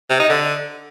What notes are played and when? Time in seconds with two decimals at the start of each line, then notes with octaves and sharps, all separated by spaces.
0.10 C3
0.20 D#4
0.30 D3